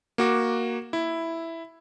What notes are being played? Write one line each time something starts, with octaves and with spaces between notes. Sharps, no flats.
A#3 F#4 D6
E4